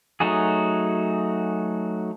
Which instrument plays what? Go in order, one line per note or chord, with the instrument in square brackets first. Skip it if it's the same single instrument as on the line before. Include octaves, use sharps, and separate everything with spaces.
[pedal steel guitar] F#3 A3 D#4 F#4 G#4